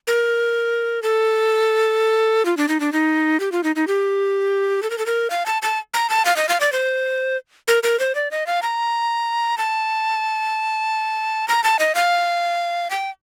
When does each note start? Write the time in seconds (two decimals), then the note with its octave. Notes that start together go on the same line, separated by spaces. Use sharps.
0.07 A#4
1.03 A4
2.45 F4
2.57 D4
2.68 D#4
2.80 D4
2.93 D#4
3.40 G4
3.52 F4
3.64 D#4
3.76 D#4
3.87 G4
4.83 A4
4.90 A#4
4.98 A4
5.06 A#4
5.30 F5
5.46 A5
5.62 A5
5.94 A#5
6.10 A5
6.25 F5
6.37 D#5
6.49 F5
6.61 D5
6.72 C5
7.68 A#4
7.83 A#4
7.99 C5
8.15 D5
8.31 D#5
8.47 F5
8.63 A#5
9.58 A5
11.48 A#5
11.64 A5
11.79 D#5
11.95 F5
12.90 G5